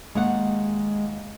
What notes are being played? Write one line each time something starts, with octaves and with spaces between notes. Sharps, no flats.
D#2 G#3 F5 F#5